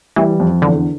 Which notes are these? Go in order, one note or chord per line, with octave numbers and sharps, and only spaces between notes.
E3 G3
F2
E2 D3